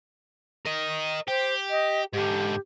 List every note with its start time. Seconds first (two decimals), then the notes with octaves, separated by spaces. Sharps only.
0.66 A#4 D#5
1.28 G4 C5
1.70 D#5
2.13 G#2 D3 G4